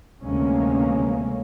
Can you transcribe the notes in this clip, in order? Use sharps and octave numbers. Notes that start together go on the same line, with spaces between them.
D2 C3 E3 G#3 A#3 C#4